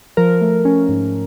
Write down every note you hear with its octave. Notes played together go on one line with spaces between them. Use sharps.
F3 A#4
A3
C#4
G#2